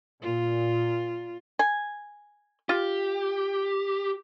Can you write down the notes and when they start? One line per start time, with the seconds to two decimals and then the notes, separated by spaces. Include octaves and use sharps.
0.22 A#2 F4
1.59 G#5
2.69 F4 G4